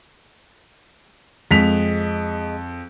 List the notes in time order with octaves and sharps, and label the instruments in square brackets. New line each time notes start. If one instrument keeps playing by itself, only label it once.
[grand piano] F2 B6 F7 [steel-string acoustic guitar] G#3